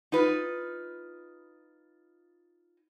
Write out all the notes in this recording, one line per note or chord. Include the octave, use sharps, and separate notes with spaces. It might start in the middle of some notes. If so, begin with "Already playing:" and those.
D#4 F4 B4